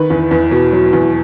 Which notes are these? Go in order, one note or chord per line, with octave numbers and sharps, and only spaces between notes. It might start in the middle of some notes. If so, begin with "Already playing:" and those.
Already playing: D#3 B4
E2
E2
B2
F#3
E2